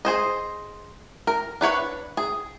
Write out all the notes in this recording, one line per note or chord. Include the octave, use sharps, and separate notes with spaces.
G#4 C5 D#5
A#4
D4 B4 C#5 F#5
G#4